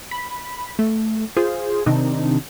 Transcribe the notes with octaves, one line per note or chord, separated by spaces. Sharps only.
B5
A3
F4 G#4 C5
C3 D#3 C4 D4 D#4